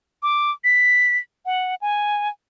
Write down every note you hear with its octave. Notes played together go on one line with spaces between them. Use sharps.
D6
B6
F#5
G#5